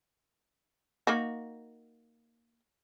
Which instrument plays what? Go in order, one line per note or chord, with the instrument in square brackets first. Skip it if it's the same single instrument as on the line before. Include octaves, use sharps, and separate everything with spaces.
[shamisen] A#3 D#4 F#4